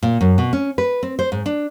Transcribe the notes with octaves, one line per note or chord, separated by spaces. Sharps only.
A#2
F#2
B2
C#4
B4
C4
C5
G#2
D4